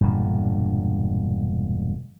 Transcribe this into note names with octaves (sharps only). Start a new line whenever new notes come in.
E1 G2 A#2 D3